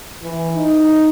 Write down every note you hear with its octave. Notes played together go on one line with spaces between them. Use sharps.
E3
D#4